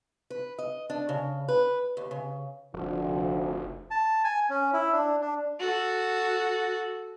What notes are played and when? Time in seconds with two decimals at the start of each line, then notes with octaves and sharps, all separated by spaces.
0.30 B4
0.59 D#5
0.90 D4
1.09 C#3
1.48 B4
1.97 D#2
2.11 C#3
2.74 F1 D2 F3
3.91 A5
4.24 G#5
4.50 C#4
4.73 E4
4.92 D4
5.21 D4
5.60 F#4 A4